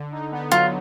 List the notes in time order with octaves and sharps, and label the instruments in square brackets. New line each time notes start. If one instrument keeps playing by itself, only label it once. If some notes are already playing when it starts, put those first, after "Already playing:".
Already playing: [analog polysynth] D3
D#4
B3
[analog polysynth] F#3 [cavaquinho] F4